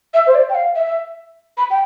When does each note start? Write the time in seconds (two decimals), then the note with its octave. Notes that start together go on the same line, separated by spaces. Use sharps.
0.14 E5
0.27 C5
0.35 D5
0.49 G5
0.55 F5
0.76 E5
1.58 B5
1.70 G5